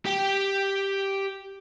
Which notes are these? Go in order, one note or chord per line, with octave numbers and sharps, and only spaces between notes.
G4 G5